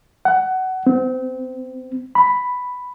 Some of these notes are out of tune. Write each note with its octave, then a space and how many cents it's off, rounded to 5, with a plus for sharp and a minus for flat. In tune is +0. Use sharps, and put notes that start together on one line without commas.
F#5 +20
C4 -25
B5 +5